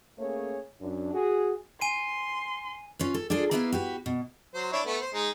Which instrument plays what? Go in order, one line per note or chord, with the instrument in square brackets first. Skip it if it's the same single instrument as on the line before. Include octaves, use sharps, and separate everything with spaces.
[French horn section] A3 A#3 C#4 G#4 C#5
F#2 D4
F#4 G#4
[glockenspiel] G#5 D#7 [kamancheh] C6
[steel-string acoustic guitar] C#4 F4 B4
A4
D4 F4 G#4 A4 D5
A#3 B3 E4 B4 E5 F5
F#4 G4 B4
B2
[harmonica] F#3 C5
D4 E4 C#5
A3 B3
C5
G#3 D#4